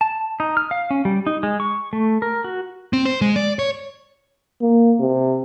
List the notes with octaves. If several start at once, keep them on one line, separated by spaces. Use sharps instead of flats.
A5
D#4
F6
F5
C#4
G3
D#4
G#3
C#6
A3
A#4
F#4
C4
C5
G#3
D5
C#5
A#3
C3